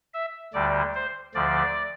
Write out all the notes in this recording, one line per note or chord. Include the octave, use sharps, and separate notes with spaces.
E5
D2 D3 G3 D5
C5
D2 D3 F3 D5